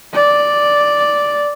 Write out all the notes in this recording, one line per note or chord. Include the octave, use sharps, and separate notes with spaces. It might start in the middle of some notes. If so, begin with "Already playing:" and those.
D5